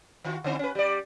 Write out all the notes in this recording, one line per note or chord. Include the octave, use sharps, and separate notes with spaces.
D#3 F4 F#4
D3 C4 E4
C#4 B4
G3 D5